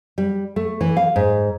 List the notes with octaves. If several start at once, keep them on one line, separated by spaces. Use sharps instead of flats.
G3
A3
E3
F5
G#2